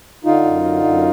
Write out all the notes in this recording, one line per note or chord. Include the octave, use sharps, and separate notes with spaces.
D3 D#4 F4
F#2
D3
F#2